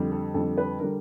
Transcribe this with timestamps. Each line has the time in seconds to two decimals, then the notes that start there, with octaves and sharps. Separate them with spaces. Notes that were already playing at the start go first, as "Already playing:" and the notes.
Already playing: F2 D3 G3
0.12 A4
0.34 F2 D3 G3 A4
0.58 B4
0.80 D3 G3 A#4